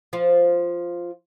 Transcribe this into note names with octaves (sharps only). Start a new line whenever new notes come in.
F3 F4